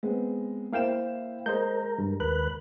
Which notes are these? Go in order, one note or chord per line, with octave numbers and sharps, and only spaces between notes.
G#3 B3 C4
A#3 E4 C5 F5 G5 E7
G#3 A#4 C5 D#5 G6
G2
D#2 A#4 B4 F#6